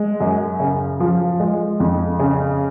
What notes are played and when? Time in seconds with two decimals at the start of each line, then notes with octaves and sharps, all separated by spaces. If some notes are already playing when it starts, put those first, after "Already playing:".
Already playing: G#3
0.20 F#2
0.60 C#3
1.00 F3
1.40 G#3
1.80 F2
2.19 C#3